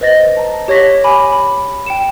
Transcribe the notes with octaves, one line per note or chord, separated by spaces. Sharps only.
B4 C5 D#5 A6 A#6
A5 A#5
G4 C#5 C#6 A#6 B6
G#5 B5 D6
B5
G5 C#7 E7